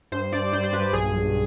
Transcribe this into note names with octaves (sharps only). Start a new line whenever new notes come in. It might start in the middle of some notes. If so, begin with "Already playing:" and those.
G2 C5
G2 D5
G2 C5
C5
G2 B4
B1 G#4
B1